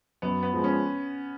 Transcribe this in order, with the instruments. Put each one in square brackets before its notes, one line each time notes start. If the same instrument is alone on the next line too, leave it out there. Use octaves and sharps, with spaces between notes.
[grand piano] F#2 [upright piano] B3
[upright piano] B3
[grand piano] F3 G#3
[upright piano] C#4